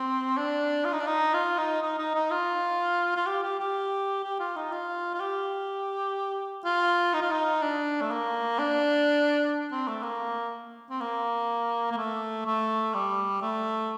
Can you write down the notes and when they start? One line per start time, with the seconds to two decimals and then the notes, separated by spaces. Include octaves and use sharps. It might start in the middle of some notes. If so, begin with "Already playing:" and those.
Already playing: C4
0.37 D4
0.85 F4
0.93 D#4
1.00 D4
1.07 D#4
1.34 F4
1.58 D#4
1.82 D#4
1.99 D#4
2.14 D#4
2.31 F4
3.16 F4
3.27 G4
3.43 G4
3.59 G4
4.23 G4
4.40 F4
4.56 D#4
4.72 F4
5.14 F4
5.20 G4
6.65 F4
7.14 D#4
7.22 F4
7.31 D#4
7.62 D4
8.01 A3
8.11 A#3
8.59 D4
9.72 C4
9.88 A3
10.03 A#3
10.90 C4
11.01 A#3
11.91 A#3
11.97 A3
12.46 A3
12.94 G3
13.42 A3